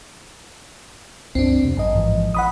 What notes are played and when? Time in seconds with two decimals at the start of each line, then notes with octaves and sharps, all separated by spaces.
1.35 C#2 G2 C4 D4
1.63 F2 C3 B3
1.77 A1 F#2 D#5
1.95 G#2 E3 F3
2.34 A1 A2 F#5 B5 D#6